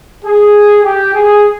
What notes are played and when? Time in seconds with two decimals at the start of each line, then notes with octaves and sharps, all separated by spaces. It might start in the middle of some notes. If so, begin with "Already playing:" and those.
0.25 G#4
0.83 G4
1.14 G#4